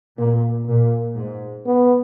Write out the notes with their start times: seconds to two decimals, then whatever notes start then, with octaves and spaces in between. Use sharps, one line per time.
0.18 A#2 A#3
0.67 A#2 A#3
1.17 G#2
1.66 B3